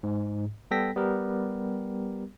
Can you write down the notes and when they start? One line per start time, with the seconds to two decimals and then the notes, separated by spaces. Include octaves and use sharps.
0.03 G#2
0.71 G3 B3 A4 G5 A#6 B6
0.96 G3 B3 G4 A#4